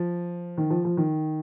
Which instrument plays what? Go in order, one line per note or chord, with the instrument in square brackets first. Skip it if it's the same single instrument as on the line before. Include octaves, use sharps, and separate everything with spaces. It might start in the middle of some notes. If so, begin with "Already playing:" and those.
Already playing: [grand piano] F3
D#3
F3
F3
D#3